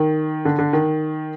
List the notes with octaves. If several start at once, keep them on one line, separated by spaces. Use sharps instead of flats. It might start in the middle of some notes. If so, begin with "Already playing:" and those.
Already playing: D#3
D3
D3
D#3